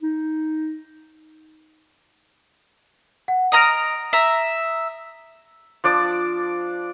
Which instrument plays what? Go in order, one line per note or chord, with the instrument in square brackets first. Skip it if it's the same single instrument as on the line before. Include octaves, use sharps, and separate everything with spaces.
[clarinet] D#4
[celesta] F#5
[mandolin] D#5 A#5 F6 [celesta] D#6 A#6 D7
[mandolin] E5 A#5
[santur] F3 D4 D5